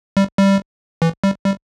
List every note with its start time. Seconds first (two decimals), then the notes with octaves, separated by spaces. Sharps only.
0.17 G3
0.37 G3
1.02 E3
1.24 G3
1.45 G3